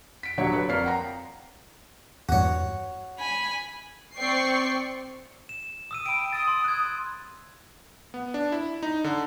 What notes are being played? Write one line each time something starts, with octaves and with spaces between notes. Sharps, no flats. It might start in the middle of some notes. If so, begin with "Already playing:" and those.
B6 D7
D#1 D3 F#3 C#5
B4
F2 A#3 C#5 D5 F6 C7
F#5 G5 A#5
E2 G2 F#4 C#5
G#5 B5
C4 D5 G5 C#6 C7
E7
D#6 E6 D#7
G5 B5 D7
D#6 A6
C6
F#6 G#6
B3
D4
E4
D#4
D3